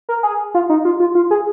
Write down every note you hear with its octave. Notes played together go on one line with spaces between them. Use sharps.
A#4
G#4
F4
D#4
F4
F4
F4
G#4